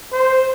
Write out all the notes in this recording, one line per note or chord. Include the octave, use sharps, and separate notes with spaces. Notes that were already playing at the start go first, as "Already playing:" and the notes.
C5